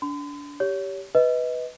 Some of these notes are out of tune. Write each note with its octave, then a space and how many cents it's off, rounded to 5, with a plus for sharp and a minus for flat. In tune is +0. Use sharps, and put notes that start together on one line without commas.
D4 -25 C6 -45
G4 +0 C#5 +25
B4 +0 D#5 +20